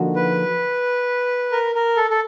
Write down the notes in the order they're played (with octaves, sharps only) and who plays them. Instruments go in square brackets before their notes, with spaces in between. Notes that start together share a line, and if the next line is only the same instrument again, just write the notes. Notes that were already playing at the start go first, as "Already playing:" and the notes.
Already playing: [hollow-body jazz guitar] D3 F3 A#3 D#4 F#4
[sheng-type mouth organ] B4
A#4
A#4
A4
A4